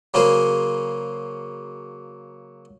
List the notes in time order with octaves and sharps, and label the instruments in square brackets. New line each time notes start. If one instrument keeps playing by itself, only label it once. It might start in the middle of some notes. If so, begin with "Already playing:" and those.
[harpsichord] C#3 F#3 A#3 G#4 C5